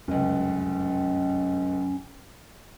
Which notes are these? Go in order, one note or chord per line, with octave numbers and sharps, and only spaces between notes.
F1 C#2 F#2 C#4